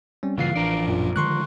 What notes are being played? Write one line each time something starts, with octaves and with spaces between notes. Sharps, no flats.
G3 C4 C#4
G2 A#2 C#3 E3 F4 F#4 F5 C7
A1 F3 D4 A#4 D5
F#2 A#2 F4
D3 D#3 G#3 C6 C#6 F#6